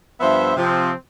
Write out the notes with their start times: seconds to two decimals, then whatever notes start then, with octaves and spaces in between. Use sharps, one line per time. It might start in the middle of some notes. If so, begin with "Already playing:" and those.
0.20 G2 F3 B3 C5 E5
0.56 C3 F3 C4